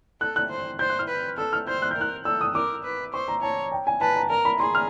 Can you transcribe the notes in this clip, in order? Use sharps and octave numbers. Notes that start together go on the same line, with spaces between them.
A4 F#6
F#6
C5
C5 G6
F#6
F6
B4
A4 E6
F6
C5 G6
F#6
G6
A#4
F#6
A4 E6
D#6
A#4 D6
B4
C5 C#6
A#5
C#5 A5
G5
G#5
B4 A5
A#5
A#4 A#5
B5
G#4 C6
F6